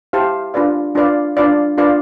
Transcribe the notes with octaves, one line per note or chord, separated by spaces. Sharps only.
E4 G4 C5 F5 A5
D4 F4 B4 D5 F5
D4 F4 B4 D5 F5
D4 F4 B4 D5 F5
D4 F4 B4 D5 F5